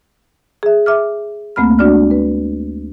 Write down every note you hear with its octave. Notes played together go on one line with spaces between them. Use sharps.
G#4 E5
E5 D6 F6
D2 A3 A#3 C4 B5 F6
G#3 D4 F#4 D5 F6
B4